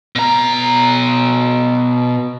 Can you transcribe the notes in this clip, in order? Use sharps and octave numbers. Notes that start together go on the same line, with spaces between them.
B2 A#5